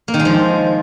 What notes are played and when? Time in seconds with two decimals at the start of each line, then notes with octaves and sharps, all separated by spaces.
0.08 A#3
0.14 D#3
0.19 G#3
0.25 F3